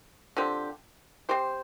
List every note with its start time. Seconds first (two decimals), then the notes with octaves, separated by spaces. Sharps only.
0.37 D3 F3 C4 G4
1.29 C4 G4 C5